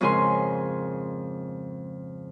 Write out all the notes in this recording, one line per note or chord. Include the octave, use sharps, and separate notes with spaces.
F2 G#2 C#3 G#4 A#4 C6